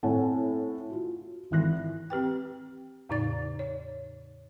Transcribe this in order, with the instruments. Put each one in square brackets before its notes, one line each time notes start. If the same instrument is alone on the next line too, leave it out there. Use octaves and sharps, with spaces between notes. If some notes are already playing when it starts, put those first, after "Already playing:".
[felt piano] A2 C4 C#5 F#5 G#5 A5
F4 F#4
G#1 E3 F#6 A#6
[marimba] C4 G4 B4 G5
E2 A2 C#3 D#4 D5 A6
C#5